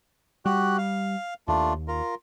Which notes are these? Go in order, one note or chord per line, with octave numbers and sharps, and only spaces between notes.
G3 F#4 G4 F#6
F5
D#2 A3 D4 F4
F4 A#4